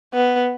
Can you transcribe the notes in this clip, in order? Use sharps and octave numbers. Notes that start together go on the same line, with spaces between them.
B3